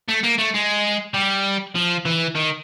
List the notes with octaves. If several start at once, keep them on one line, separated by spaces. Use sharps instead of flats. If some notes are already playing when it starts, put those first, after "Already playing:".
A3
A#3
A3
G#3
G3
F3
E3
D#3